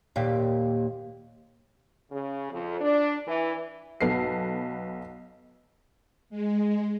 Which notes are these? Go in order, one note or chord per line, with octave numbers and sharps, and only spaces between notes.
D#2 A#2 G4
C#3
F2
D4
E3
B1 B3 A4 C7
G#3